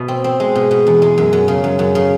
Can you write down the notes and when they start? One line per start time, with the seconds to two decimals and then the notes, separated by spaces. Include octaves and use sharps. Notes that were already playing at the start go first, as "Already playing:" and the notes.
Already playing: B2
0.08 C4
0.24 C4
0.40 G#3
0.55 B2
0.71 B2
0.87 E2
1.02 G#3
1.18 F#2
1.33 F#2
1.48 C#3
1.64 F#2
1.79 F#2
1.95 C#3